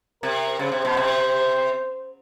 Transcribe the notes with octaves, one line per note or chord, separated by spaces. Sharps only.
C3 A#4
C#3 C5
C3
B2
C3